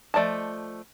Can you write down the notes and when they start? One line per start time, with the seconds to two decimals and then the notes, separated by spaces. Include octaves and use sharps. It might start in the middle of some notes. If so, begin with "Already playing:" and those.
0.14 F3 A3 D5 D#5 A5